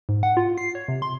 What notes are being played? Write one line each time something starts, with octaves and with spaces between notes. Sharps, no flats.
G#2
F#5
F4
C7
C#5
C3
C6